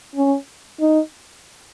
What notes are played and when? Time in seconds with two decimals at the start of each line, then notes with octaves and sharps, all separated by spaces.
0.15 C#4
0.80 D#4